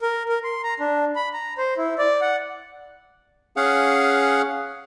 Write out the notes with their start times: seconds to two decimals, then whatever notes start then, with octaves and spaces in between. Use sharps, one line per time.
0.02 A#4
0.29 A#4
0.44 C6
0.63 A#5
0.80 D4
1.16 B5
1.34 A#5
1.58 C5
1.78 E4
1.98 D5
2.21 F#5
3.57 C#4 G#4 F5 F#5